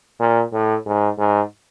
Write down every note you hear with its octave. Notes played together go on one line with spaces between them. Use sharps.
A#2
A2
G#2
G#2